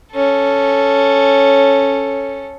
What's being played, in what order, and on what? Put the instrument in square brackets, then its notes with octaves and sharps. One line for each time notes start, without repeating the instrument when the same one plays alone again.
[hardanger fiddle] C#4 A4